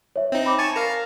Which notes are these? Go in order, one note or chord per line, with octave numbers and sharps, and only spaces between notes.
C#5 E5
C4 D#4
B5 D6
G#5 A5 C#6 A6 E7
A#4 F5 A#5